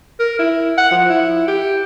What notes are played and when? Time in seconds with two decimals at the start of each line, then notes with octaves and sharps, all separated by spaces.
0.20 A#4
0.39 E4
0.78 F#5
0.91 F3
1.09 E4
1.48 G4